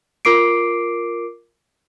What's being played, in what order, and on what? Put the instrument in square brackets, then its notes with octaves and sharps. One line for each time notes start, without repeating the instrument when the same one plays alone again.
[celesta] F4 A#4 D6 C7 D7